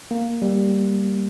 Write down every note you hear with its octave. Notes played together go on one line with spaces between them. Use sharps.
A#3
G3